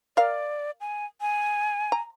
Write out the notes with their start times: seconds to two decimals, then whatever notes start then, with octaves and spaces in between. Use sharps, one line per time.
0.17 A#4 D5 F5
0.80 G#5
1.21 G#5
1.92 A#5